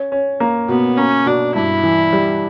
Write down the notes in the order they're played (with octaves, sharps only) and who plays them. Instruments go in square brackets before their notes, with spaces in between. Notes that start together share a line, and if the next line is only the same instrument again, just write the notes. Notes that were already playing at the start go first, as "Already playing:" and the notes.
Already playing: [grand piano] C#4
C#4
A#3
[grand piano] B2 [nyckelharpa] B3
[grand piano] A#3 [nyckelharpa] C#4
[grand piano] B2 [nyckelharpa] D4
[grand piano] G2 [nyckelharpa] E4
[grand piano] E3
G3